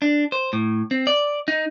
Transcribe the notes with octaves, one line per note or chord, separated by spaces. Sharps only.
D4
C5
A2
C4
D5
D#4